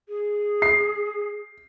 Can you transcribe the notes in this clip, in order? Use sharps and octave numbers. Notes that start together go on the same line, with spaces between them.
G#4
C7